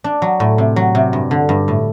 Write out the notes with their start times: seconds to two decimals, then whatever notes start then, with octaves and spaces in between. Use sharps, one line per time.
0.04 D4
0.22 F#3
0.40 A2
0.58 C3
0.76 F#3
0.95 C3
1.13 G2
1.31 D3
1.49 G2
1.68 A2